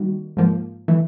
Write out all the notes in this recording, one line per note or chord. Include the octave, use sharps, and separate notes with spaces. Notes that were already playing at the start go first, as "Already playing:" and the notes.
Already playing: D#3 G3 A#3 F#4
G#2 F3 A#3
E3 A3